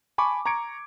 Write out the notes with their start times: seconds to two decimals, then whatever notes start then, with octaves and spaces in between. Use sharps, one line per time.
0.18 G#5 A5 B5 C#6 D6
0.46 A#5 C#6 G#6 C#7 D7